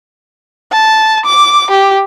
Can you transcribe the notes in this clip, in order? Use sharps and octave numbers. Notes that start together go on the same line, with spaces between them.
A5
D6
G4